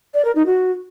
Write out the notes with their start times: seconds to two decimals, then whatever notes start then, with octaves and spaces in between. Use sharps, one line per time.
0.14 D5
0.25 A#4
0.35 D#4
0.46 F#4